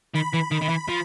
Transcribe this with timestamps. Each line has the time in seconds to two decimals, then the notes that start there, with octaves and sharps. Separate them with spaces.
0.15 D#3 B5
0.34 E3
0.52 D#3
0.62 D#3
0.69 E3
0.89 F3